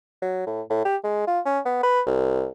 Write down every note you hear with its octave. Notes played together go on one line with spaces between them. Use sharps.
F#3
A2
A2
G4
G#3
F4
C#4
B3
B4
C2